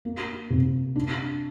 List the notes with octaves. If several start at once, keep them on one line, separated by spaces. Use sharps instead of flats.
A#3
C3
D4